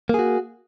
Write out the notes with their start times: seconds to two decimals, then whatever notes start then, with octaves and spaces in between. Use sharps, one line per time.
0.09 A#3
0.14 G#4
0.19 F#4